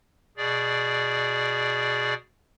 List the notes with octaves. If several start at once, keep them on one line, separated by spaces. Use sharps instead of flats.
B2 G#4 D5